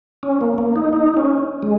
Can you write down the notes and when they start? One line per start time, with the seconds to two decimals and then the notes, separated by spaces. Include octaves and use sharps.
0.23 C#4
0.41 A#3
0.58 A#3
0.76 D#4
0.93 D#4
1.17 C#4
1.63 G#3